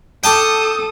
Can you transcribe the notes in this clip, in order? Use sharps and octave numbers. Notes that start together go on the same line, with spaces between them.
A4 G5 A5 D6 D#6